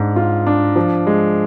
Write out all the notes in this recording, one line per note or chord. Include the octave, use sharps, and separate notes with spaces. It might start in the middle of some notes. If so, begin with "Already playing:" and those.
Already playing: G#2 D4
F4
D4
F3
G#3